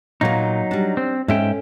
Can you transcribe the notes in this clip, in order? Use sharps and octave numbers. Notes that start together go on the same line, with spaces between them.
A#2 F#3 A#3 D#4
G3 D4
C4
G#2 C#4 A4 E5 G5